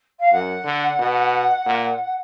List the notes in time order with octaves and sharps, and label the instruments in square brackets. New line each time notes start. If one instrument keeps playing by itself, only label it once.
[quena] F5
[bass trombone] F#2 [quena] F#5
[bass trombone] D3
B2
A#2